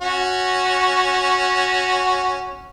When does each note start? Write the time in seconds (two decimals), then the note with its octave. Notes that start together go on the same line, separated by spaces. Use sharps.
0.02 C#4 F#4